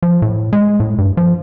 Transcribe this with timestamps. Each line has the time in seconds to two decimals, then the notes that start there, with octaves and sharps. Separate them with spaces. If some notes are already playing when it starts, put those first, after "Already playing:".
0.03 F3
0.22 A2
0.53 G#3
0.80 A2
0.98 G2
1.17 F3